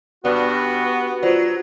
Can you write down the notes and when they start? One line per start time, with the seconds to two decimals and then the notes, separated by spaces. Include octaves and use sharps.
0.25 G2 B3 F#4 D5
1.23 F#3 F4 C5 D5